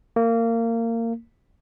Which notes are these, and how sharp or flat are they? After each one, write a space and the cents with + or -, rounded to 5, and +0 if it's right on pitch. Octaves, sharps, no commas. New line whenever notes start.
A#3 -25